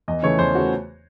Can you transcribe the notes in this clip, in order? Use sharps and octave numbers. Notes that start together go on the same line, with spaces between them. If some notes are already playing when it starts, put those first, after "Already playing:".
E2 D#5
C#3 E3 A3 C#5
E2 C5
C#3 E3 A3 F#4